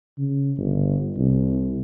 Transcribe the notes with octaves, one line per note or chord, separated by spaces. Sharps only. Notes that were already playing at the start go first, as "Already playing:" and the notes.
C#3
G1
C2